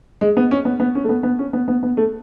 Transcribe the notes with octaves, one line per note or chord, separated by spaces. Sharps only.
G#3
B3
C#4
B3
B3
C#4
A3
B3
B3
C#4
B3
B3
B3
A3